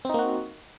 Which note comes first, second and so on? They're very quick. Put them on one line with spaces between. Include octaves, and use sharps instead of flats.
C4 D#4 A#3 F#4